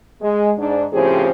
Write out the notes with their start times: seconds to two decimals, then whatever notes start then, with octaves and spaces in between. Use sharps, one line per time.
0.22 G#3
0.58 G#2 D4
0.93 A2 C#3 F3 C4 G4 G#4